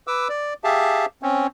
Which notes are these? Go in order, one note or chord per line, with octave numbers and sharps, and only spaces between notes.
B4 D6 E6
D5
G4 G#4 E5 F5 A5
C4 C#4